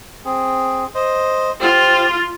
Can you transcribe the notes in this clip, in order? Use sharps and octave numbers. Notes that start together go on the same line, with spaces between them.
C4 G#4
C5 D#5
F4 G4 C5